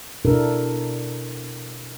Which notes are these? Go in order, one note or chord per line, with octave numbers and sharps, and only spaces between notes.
B2 D4 E4 A4 A#4